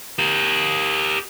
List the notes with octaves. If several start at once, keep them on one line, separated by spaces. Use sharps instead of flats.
G4 A#4